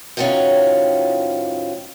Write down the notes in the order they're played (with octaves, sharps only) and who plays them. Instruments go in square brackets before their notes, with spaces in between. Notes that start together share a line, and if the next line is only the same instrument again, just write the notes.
[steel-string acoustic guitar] A2 D#3 F3 F#3 C#4 F4